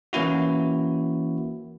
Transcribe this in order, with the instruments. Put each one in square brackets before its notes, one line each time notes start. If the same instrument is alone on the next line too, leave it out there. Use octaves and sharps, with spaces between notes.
[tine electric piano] E3 A#3 C#4 E4 F#4